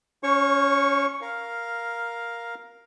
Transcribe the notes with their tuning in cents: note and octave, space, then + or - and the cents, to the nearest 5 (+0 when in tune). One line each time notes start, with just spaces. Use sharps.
C#4 +15 C#5 -30 C#6 +0
A#4 +5 F5 +0